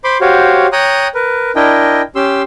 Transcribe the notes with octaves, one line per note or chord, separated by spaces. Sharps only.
C5 B5 C6 D6
F#4 G4 C5 C#5 F5
C#5 G5 A#5 D#6 F#6
A#4 B4
D4 E4 A#4 D#5 G5
C#4 G4 C6 E6